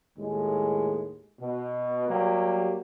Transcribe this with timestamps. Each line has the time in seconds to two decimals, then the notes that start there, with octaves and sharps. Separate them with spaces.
0.17 D#2 A2 G#3
1.39 B2
2.09 F#3 G3 A#3 G4